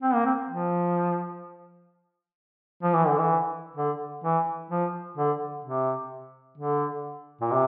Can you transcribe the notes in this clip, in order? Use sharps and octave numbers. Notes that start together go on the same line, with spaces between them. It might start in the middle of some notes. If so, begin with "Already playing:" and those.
C4
A#3
C4
F3
F3
E3
D3
E3
D3
E3
F3
D3
C3
D3
A#2
C3